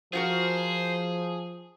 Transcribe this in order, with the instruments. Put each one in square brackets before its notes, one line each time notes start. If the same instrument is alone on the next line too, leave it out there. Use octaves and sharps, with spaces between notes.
[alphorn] F3 [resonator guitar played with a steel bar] F4 F#4 A#4 [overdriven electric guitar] G#4 [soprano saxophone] C5